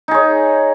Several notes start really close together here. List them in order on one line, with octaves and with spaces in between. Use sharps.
D#4 G#4 C#5